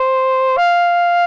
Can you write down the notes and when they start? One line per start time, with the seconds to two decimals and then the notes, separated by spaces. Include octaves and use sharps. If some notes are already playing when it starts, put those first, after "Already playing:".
Already playing: C5
0.57 F5